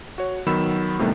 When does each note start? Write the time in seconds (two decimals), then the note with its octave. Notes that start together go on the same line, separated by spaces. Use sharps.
0.18 F#4 C#5
0.46 D#3 F#3 B3 B5 E6 E7
0.99 A2 C3 D#3 G3 A3 B3